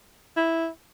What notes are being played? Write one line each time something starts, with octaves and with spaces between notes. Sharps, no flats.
E4